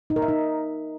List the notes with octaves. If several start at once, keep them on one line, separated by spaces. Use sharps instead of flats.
D#4
A#4
E5
D#4